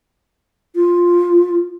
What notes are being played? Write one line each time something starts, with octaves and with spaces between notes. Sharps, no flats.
F4